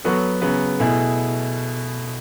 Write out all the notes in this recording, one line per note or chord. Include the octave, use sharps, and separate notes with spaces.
F#3 B3 F#4 A4
C#3 F#3 B3
B2 A3 E4 G#4